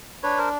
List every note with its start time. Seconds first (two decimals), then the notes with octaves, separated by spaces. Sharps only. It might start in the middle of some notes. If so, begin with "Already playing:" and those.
0.23 D4 B4 C#5
0.38 A#4 C5